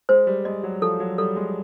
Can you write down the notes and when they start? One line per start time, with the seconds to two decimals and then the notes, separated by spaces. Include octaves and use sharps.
0.09 G#3 C5
0.27 G3
0.45 G#3 D#5
0.63 F#3
0.82 F3 A4
1.00 F#3
1.18 G3 A4
1.36 G#3